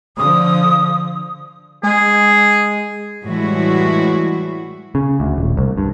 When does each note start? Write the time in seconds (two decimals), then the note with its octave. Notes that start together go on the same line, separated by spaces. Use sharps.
0.17 D3 F3 D#6
1.83 G#3 G#4
3.23 A2 E3 G3 G#3 E4 F#4
4.95 C#3
5.20 D2
5.38 D#1
5.57 C2
5.78 G2